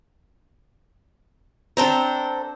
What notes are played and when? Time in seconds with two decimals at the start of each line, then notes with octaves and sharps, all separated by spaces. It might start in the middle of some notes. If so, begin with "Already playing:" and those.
1.77 C4 D4 A4 C5 A#5